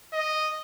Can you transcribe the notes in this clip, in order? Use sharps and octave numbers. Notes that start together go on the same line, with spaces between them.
D#5